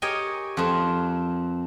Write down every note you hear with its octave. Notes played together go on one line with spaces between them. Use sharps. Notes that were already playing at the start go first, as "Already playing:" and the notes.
G4 A#4 C#5 D#5 G5 G#5
F2 C4